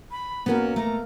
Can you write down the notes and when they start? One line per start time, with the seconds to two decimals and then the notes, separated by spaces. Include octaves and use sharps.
0.11 B5
0.46 A#2 A#3 B3 C#4 F#4 A#4
0.76 A3 A#5